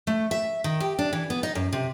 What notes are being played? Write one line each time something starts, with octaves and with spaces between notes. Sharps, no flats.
A3
E5
D#3
G4
D4
E3
B3
D#4
F#2
C3